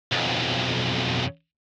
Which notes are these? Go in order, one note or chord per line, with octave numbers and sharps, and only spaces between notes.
B1 F2